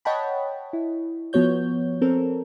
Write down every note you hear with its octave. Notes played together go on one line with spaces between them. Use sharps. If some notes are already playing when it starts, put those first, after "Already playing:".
C#5 D#5 F#5 G5 A5 B5
E4
F3 B3 F#4 C#5 G6
C4 A4 A#4